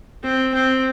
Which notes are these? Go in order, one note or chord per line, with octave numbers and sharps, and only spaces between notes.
C4
C4